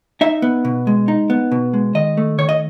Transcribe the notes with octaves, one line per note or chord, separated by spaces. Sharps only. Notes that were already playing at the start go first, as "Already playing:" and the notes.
D#4 E5
B3
B2
G#3
D#4
B3
B2
G#3
D#3 D#5
A3
D#3 C#5
D#5